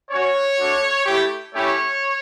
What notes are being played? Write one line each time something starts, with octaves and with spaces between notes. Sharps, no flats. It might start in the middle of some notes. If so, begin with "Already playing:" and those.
C#4 F#4 C#5
A3 D4 F#4
A3 E4 G4
A3 C#4 E4 G4 C#5